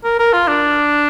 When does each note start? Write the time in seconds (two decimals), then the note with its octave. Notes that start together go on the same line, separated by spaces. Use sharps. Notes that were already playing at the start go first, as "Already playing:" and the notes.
0.04 A#4
0.19 A#4
0.33 F4
0.47 D4